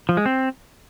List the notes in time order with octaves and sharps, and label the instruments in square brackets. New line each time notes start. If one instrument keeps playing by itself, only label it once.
[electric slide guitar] F3
G#3
C4